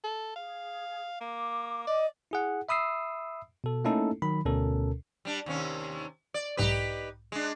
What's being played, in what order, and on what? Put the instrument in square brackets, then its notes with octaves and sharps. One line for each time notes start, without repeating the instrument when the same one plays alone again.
[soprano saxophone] A4
[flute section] G#4 [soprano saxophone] F5
[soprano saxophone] A#3 [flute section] D6
[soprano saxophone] D5 [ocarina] D#5
[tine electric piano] E4 G#4 F#5
E5 B5 D#6 E6 C7
B2 A4
A3 A#3 C#4 D#4 E4 A4
D#3 F#3 B5
D2 B2 C#4 A4 A#4
[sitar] G3 D4
D#2 C3 C#4
D5
[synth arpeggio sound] B1 G#2 D6 [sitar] D#4 G4 B4
[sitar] G#3 D4